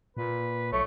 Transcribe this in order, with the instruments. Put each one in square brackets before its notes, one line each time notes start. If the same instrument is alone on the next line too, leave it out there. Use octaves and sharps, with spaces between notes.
[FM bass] A#2 [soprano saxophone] B4
[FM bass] B1 [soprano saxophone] A3 [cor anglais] C#5